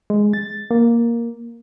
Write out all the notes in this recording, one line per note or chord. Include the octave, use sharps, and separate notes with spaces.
G#3
A6
A#3